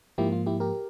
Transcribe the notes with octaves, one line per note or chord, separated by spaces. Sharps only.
G#2 F3 A#3 E4 G4
F4
E4 G4
G4 A#4